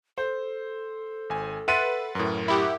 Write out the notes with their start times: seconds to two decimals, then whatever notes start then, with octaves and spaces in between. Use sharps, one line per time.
0.18 A4 C5
1.30 G#1 G#5
1.68 B4 E5 F#5 C6 A6 D#7
2.15 F#2 A2 A#4
2.48 E4 G4 F#5